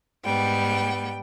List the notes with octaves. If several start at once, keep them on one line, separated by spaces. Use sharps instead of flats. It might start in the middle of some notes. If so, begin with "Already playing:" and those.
G#2 G3 B3 G5